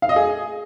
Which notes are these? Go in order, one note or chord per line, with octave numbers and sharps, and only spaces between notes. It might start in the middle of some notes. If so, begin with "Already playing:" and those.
F5
D#5
G#4